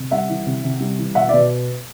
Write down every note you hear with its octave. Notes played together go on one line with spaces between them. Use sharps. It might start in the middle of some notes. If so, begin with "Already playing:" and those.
Already playing: C3
G3 E5 F#5
E3
C3
C3
G3
E3
B2 E5 F#5
D5 E5
B2